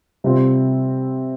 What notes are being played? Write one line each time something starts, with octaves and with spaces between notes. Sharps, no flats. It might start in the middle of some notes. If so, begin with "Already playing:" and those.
C3 G3 C4 F4